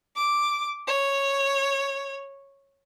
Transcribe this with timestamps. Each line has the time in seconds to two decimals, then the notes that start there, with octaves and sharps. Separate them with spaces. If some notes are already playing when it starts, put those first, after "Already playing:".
0.16 D6
0.87 C#5